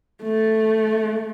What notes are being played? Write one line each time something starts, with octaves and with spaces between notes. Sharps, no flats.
A3